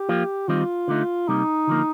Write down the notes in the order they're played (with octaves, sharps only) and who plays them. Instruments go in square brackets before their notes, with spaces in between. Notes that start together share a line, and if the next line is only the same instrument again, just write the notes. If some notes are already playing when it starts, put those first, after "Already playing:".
Already playing: [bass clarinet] G4
[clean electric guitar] F3 A#3 F4
[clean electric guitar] D#3 G3 C4 D#4 [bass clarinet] F4
[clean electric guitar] D3 A3 D#4
[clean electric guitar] C3 G3 A#3 [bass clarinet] D#4
[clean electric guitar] D3 F3 A#3